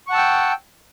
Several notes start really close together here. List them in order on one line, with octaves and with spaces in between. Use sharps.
C#6 F#5 A5 E6 G5